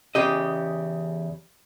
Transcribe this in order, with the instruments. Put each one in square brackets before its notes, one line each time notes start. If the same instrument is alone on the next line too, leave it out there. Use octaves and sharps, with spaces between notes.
[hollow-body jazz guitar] E2 C#3 G4 D#5